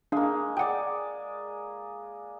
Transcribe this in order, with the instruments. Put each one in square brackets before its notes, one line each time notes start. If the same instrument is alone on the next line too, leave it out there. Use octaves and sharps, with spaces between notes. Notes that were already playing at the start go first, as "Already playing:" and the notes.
[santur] G#3 A#3 [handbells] D4 F5
[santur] G#4 D5 [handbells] F#5 G5